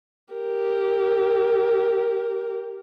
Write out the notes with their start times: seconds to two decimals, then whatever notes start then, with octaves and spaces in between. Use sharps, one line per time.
0.33 G4 A#4